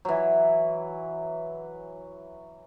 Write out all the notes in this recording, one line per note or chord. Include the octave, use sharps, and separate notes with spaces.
E3 F#3